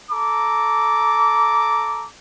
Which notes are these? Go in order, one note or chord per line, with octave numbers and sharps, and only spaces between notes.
A4 A#5 D6